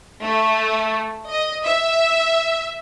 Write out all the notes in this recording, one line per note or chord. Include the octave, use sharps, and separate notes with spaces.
A3
D#5
E5